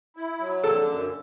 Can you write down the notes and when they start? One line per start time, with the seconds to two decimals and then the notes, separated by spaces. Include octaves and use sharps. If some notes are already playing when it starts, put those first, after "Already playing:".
0.16 E4
0.40 F#3
0.64 D3 A4
0.86 F#2